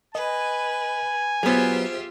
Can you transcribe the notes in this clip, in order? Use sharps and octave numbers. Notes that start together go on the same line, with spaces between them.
B4 D#5 G#5
F#3 B3 F4 G4 G#4 C5 E5